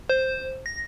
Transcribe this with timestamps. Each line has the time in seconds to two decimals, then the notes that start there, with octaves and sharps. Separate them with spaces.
0.09 C5
0.66 A#6